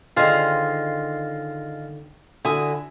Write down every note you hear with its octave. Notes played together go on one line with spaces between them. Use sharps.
D3 D#3 F4 G#4 C5 D#5 F5
D3 E4 F#4 G#5 D#6